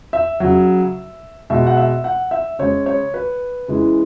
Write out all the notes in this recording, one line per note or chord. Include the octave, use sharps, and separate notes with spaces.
E5
C#3 F#3
B2 G#3 E5
F#5
E5
F#5
E5
C#3 G#3 C#5
C#5
B4
C#3 E3 G#3